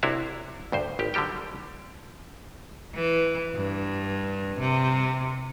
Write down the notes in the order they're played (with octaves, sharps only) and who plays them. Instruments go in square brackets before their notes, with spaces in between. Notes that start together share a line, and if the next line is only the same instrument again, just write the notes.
[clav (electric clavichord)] C2 C3 D4 E4 F#4 C#5
D2 G2 C5
G#1 G4
D3 F#3 G3 G4 G5
[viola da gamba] E3
G2
C3